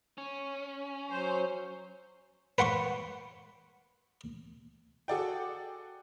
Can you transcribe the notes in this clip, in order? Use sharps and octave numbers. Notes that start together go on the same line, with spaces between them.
C#4
F#3 C5
B4 F#5 C6 C#6
F#4 G#4 A4 D5 F#5 G5